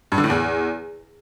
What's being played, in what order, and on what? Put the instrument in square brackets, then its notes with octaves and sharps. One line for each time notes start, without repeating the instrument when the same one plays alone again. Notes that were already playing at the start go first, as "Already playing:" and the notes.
[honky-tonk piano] G2
D3
A2
E2